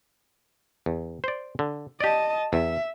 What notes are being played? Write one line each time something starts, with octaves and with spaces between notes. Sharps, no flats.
E2
C5 D5
D3
G4 D5 D#5 A5
E2 E5